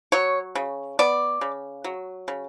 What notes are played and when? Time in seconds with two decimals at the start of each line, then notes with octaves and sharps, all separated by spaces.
0.12 F#3 C#5
0.55 C#3
0.99 B3 D5
1.41 C#3
1.84 F#3
2.28 C#3